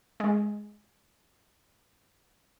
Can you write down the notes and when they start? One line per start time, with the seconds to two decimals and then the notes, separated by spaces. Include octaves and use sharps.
0.20 G#3